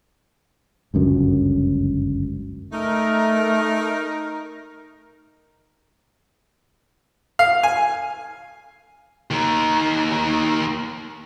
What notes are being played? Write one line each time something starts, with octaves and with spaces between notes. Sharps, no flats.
G1 C#2 F#2 D3
A3 D#4 A#4
F5
G#5
D#2 D#3